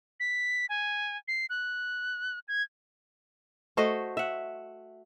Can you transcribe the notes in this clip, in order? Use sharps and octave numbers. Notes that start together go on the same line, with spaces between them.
B6
G#5
C7
F#6
G#6
A3 F#4 C5 D#5
E5 F#5